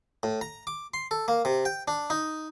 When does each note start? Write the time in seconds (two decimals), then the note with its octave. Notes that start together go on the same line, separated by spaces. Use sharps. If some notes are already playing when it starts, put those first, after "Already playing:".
0.23 A2
0.41 A#5
0.67 D6
0.94 C6
1.11 A4
1.28 A#3
1.45 C3
1.65 G5
1.88 D4
2.10 D#4